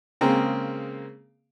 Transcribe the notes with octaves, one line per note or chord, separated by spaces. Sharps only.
C#3 G#3 A#3 C4